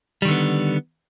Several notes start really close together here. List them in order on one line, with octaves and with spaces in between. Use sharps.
G3 D#3 D3 B3